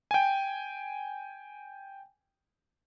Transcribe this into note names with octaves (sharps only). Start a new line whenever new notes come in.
G5 G#5